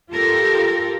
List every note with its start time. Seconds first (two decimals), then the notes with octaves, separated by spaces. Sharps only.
0.10 F4 G4 A4 A#4